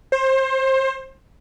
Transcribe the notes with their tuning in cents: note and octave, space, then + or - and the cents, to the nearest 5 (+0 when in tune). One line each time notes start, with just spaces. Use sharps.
C5 +25